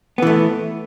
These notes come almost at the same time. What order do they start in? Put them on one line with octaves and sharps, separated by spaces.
B3 E3 A3